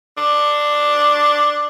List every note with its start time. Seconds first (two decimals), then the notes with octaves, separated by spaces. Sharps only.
0.17 D4